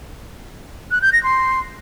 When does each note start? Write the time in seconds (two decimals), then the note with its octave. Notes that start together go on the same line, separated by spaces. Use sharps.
0.91 F#6
1.02 G6
1.13 A#6
1.23 C6